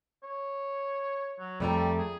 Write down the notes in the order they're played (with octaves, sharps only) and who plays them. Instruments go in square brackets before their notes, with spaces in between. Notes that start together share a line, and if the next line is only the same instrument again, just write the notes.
[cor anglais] C#5
F#3
[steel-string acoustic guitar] F2 A3 A#5 [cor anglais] G3
[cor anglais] G#4